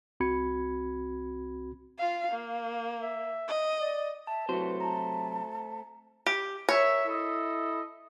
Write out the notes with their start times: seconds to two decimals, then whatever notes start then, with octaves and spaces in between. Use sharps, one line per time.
0.20 C2 C4 F#4 B5 G#6 C#7
1.98 F4 F5
2.32 A#3 F5
3.01 E5
3.48 D#5
3.81 D5
4.27 E5 A5
4.49 C3 F#3 A3 E4 F#4 B4 C5
4.80 A5 A#5
6.26 G4
6.69 A#4 C#5 E5
7.06 E4 A4 D#5